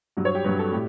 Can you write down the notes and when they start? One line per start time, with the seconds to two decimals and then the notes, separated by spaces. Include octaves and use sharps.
0.17 G2 F#3
0.25 C#5
0.35 G4
0.44 G2 F#3 B4
0.59 A4
0.72 A2 G4